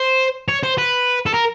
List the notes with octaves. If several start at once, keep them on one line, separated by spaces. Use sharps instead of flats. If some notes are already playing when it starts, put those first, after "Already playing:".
Already playing: C5
C#5
C5
B4
A4
A#4